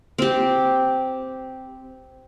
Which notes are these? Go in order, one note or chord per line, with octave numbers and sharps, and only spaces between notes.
C4 G4